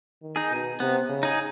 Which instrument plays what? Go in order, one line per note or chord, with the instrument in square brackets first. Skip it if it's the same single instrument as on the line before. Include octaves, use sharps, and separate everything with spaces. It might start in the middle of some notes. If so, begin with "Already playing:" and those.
[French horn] D#3
[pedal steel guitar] D#4 G#4
[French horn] B2
[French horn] C3 [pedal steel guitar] B3
[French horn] C#3
[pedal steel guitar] D#4 G#4